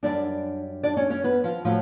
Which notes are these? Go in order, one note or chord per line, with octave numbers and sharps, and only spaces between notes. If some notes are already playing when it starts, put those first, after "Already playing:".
F#2 D#3 G3 D4 D5
D4 D5
C#4 C#5
C#4 C#5
B3 B4
F3 F4
A2 F3 F#3 F4